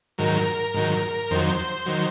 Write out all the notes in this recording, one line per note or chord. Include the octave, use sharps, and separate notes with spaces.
G#2 D#3 F#3 A#4
G#2 D#3 F#3
F2 D#3 F#3 C5
D#3 F#3